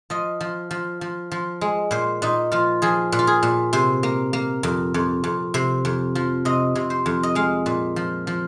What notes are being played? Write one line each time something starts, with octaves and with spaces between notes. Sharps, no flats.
F3 D#5
F3
F3
F3
F3
G#3
A#2 C5
A#2 D#4
F3 F4
F3 G#4
A#2
F4
G#4
A#2
C3 C5
A#3
A#3
F2
F2
F2
C3 C5
F2
F3
C3 D#5
C3
C5
F2
D#5
G#3 F5
A#2
F3
F3